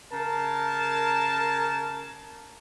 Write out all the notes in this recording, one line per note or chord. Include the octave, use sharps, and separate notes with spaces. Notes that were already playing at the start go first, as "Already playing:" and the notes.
C#3 A#4 A5